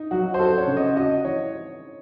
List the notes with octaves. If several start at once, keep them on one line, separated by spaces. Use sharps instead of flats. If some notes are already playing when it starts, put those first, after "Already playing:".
Already playing: D#4
F#3 F#4
C5
F#4 A4
C#5
C#3
D#5
F#4 D#5
E3 C#5